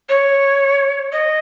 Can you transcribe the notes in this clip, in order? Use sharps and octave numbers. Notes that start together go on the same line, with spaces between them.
C#5
D#5